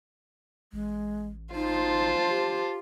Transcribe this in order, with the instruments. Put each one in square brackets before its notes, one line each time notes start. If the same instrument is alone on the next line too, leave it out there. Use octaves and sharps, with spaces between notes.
[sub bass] A1 [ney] G#3
[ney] D#4 [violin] F4 [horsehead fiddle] C5 A5
[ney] G4